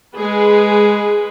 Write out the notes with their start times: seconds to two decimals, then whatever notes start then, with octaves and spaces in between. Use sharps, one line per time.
0.16 G#3 G#4 B4